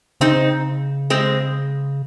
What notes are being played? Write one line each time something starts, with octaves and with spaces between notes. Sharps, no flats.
C#3 C4 D#4
G#3 C4